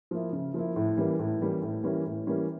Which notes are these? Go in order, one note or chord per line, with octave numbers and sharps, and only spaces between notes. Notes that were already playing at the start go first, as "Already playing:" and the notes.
F3 A#3 E4
C#3
F3 A#3 E4
A2
E3 G3 A#3 C#4
A2
E3 G3 A#3 C#4
A2
E3 G3 A#3 C#4
A2
E3 G3 A#3 C#4